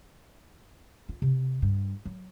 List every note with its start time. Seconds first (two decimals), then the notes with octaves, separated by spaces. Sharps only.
1.09 F4
1.22 C3
1.62 G2
2.05 F#3